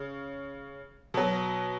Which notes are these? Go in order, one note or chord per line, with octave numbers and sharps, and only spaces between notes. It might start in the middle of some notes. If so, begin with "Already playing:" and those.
Already playing: C#3
B2 F#3